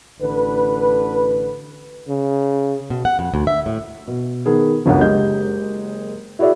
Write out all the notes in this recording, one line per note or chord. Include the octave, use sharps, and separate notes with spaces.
A1 D3 B4
C#3
B2
F#5
F2
D2
E5
A2
B2
D#3 B3 G#4
G1 C#2 F#2 D3 F#5
F#1 G#3 G4 D#5 G6
E4 F#4 G#4 D5 E5